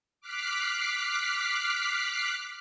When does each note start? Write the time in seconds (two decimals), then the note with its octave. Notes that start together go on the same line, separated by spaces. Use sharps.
0.21 D6 F6 F#6 B6 C7